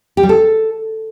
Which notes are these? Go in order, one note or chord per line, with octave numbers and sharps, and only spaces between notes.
G4
G3
A4